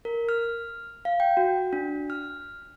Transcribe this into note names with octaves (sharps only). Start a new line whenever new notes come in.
A#4
F6
F5
G5
F#4
D4
F6